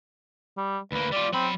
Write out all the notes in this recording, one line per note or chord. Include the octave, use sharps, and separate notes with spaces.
G3
D2 A#3 B4
G3 F4 D5
F#3 C4 B5